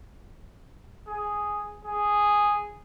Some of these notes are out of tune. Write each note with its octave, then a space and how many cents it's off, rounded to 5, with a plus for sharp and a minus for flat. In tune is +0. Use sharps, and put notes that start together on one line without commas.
G#4 +0
G#4 -5